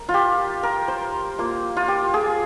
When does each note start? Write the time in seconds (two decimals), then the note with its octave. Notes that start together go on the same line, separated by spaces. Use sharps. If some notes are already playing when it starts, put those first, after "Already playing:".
Already playing: A#4
0.09 F4
0.14 G4
0.63 A#4
0.88 C5
1.39 A#3 F4
1.77 F4
1.88 G4
2.14 G#4